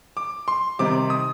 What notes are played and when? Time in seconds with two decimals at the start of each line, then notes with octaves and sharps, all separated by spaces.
0.17 D6
0.48 C6
0.79 C3 D#3 G3 C4 D#4 D6
1.10 D#6